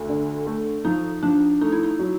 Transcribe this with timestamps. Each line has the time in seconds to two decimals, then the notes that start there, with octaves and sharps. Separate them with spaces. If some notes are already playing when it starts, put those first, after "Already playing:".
Already playing: D2
0.09 D3
0.47 A3
0.85 F3 D#4
1.23 F3 D4
1.61 A3 D#4
1.72 E4
1.83 D#4
1.99 F#3